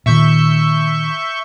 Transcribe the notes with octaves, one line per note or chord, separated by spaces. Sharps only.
A#2 D#3 E5 C#6 G6